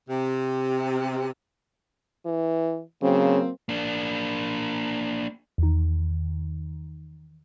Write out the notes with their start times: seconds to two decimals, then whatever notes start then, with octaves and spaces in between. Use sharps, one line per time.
0.10 C3
2.26 E3
3.02 C#3 F#3 A#3 C4
3.69 A#3 D4
5.58 E2 D#3